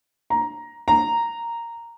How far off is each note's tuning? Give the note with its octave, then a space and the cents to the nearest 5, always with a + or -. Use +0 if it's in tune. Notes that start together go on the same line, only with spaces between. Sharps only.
A#5 +10
A#5 -5